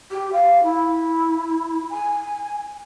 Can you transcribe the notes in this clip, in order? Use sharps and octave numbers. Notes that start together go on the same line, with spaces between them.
G4
F5
E4
G#5